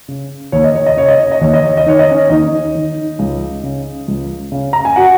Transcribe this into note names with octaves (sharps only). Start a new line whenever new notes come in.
C#3
D#2 C#5
D#5
C#5
D#5
C#3 C#5
D#5
C#5
D#5
D#2 C#5
D#5
C#5
D#5
D#3 C#5
D#5
C#4 C#5
D#2 D#4 D#5
D#3
C#2
C#3
C#2
C#3
A#5
G#5
F#4 F#5